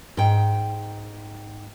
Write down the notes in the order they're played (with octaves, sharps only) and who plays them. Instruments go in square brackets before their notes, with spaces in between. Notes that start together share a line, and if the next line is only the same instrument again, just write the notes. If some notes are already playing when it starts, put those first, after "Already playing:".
[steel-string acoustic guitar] G#2 G5